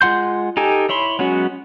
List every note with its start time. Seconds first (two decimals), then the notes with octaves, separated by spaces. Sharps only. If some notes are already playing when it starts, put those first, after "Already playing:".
0.01 G#3 F4 F#5 C6 G6
0.57 D#4 G4 A4 G#5
0.89 E4 C#5 B5 C6
1.19 F#3 G#3 B3 C#4 F#4